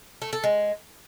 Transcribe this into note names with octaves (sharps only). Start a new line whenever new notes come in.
A3
A4
G#3